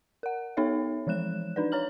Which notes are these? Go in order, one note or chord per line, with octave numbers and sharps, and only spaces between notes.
A#4 F#5
B3 D#4 A4 C#5 E5
E3 F3 G#3 F#6 E7
D4 D#4 B4 D5
C#5 A#5 F6 F#7